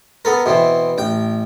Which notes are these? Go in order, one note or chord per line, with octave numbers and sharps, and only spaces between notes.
B3 A4 A#4
B2 E3 C4
A1 G5